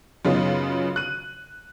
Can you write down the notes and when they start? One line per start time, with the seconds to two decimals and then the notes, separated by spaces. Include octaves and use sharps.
0.25 F#2 C#3 B3 D#4 F4
0.96 F#6 D#7